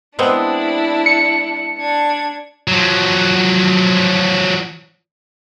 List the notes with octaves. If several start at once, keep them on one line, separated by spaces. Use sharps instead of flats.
G#3 B3 C4 D4 E4
C#7
D4 G#6
F3 F#3